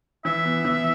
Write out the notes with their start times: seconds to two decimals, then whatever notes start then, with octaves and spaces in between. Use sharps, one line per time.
0.25 E3 E5
0.45 B3
0.65 E3